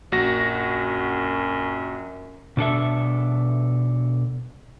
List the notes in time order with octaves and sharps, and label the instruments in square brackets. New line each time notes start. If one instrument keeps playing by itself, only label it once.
[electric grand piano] A#1 F#4 A#6 [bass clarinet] F#2
[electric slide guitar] B2 D4 A4 E5